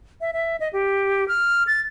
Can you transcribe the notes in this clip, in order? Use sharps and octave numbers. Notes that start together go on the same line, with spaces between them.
E5
E5
D#5
G4
F6
A6